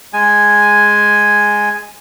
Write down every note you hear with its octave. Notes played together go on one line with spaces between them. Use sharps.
G#3 G#5